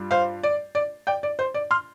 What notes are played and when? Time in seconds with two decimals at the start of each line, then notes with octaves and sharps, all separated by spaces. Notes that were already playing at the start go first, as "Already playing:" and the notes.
Already playing: G2 G3 F4
0.11 C5 F5
0.43 D5
0.75 D5
1.07 D5 G5
1.23 D5
1.39 C5
1.54 D5
1.71 C6 F6